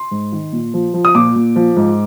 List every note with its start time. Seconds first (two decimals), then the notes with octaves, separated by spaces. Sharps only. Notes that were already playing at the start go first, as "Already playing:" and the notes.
Already playing: C6
0.11 G#2
0.32 D#3
0.52 A#2
0.74 F3
0.94 F3
1.05 D#6
1.15 A#2 D6
1.36 A#2
1.56 F3
1.76 G#2